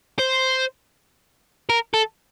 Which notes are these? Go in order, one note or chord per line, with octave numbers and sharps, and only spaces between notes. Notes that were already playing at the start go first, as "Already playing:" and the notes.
C5
A#4
A4